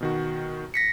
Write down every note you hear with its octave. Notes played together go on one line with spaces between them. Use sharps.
B2 D#3 F#4
A#6 B6 C#7